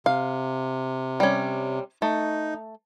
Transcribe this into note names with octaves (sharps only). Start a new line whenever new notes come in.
C3 F5
G3 C#4
A3 D#4